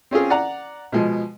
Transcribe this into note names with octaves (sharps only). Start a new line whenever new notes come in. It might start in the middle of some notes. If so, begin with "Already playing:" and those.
C4 C#4 F4 G#4
D5 F#5 A#5
B2 F3 G#3